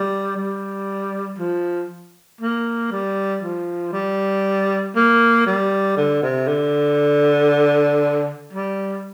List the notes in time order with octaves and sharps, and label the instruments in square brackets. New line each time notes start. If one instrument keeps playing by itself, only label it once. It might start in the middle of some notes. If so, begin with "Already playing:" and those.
Already playing: [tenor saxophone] G3
G3
F3
A#3
G3
F3
G3
A#3
G3
D3
C3
D3
G3